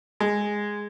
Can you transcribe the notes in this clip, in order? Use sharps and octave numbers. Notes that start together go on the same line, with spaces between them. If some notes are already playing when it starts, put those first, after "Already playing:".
G#3